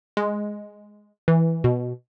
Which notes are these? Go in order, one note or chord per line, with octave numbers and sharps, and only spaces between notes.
G#3
E3
B2